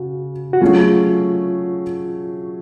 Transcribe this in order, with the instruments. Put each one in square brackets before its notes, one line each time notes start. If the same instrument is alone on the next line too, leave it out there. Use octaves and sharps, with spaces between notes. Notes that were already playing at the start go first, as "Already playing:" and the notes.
Already playing: [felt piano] C#3 [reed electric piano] F#4
[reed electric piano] F#4
[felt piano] F#3 A3 C#4 G#4 [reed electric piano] F4